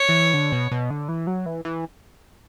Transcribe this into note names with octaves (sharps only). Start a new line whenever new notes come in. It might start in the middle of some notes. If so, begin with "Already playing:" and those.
Already playing: C#5
E3
D3
B2
B2
D3
E3
F#3
E3
E3